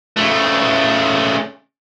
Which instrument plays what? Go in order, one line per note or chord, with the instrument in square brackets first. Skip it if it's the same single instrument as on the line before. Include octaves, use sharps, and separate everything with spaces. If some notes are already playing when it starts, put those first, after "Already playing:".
[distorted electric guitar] C#3 A3